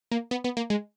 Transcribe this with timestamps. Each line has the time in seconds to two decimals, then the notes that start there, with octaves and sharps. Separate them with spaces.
0.12 A#3
0.31 B3
0.44 B3
0.57 A#3
0.70 G#3